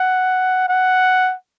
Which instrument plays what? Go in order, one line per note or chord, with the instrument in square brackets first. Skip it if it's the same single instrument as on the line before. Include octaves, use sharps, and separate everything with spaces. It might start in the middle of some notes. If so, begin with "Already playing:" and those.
Already playing: [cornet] F#5
F#5